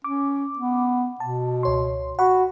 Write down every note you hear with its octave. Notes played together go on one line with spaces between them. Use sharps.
C#4 D6
B3
B2 A5
C#2 C#5 C6
F#4 F#5 B5 C#6